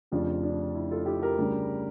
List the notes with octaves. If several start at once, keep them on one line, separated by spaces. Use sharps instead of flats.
F1 F2 C#3 D4 F4
D4
E4
F4 A4
E4 G4
G4 A#4
D2 C#3 G3 D4